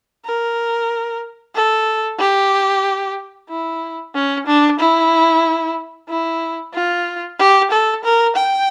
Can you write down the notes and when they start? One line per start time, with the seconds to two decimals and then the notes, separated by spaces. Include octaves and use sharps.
0.26 A#4
1.55 A4
2.19 G4
3.49 E4
4.15 C#4
4.47 D4
4.79 E4
6.09 E4
6.74 F4
7.39 G4
7.71 A4
8.04 A#4
8.36 G5